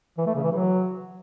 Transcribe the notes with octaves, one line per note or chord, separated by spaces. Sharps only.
E3
A3
C#3
E3
F#3